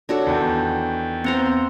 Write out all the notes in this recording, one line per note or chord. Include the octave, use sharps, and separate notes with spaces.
D4 F#4 A4 C#5
E2 D#3
B3 C4 C5 A#5 C6